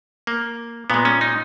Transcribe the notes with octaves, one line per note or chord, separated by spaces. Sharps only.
A#3
A#2 G#3 B3
C#4
D#4